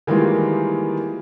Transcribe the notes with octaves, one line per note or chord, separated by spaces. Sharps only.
D#3 E3 G3 G#3 A#3 F4